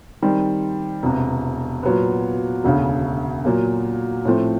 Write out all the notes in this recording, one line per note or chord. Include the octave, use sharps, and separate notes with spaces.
D#3 G3 C4
E1 E2 C3
A#2 F#3 B3
E1 D2 C#3
A#2 F#3 A#3
A2 F3 A3 C4